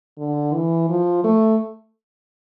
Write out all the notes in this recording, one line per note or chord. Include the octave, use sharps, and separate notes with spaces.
D3
E3
F3
A3